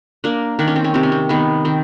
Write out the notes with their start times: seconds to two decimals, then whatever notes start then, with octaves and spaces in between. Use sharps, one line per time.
0.24 A#3 D4
0.59 D#3 D4
0.67 C#4
0.76 C4
0.84 C#4
0.94 C3 C4
1.03 C#4
1.12 C4
1.29 D#3 B3
1.65 D#3 C4